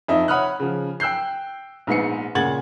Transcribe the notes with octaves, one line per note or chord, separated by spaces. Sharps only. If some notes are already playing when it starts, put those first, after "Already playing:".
F2 D#4 E5
C#5 F#5 B5 D#6 F6 F#6
C#3 F3
G5 E6 F#6 G6 C7
A#1 G#2 B3 C7 C#7
A#2 C#3 F#5 G#6 A6 F#7